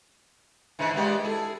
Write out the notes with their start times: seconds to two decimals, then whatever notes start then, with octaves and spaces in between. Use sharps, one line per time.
0.79 G#2 D3 E3
0.94 A#2 G#3 B3 G4
1.24 E4 G#4 A4